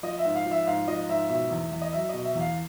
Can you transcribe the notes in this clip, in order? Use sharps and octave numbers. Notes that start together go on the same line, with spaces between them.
F3 D#5
E5
G#2
F5
F3
E5
G#2 F5
F3 D#5
G#2 E5
B2 E5
E2
E2
D#5
F#3 E5
B2 D#5
E5
E2 F5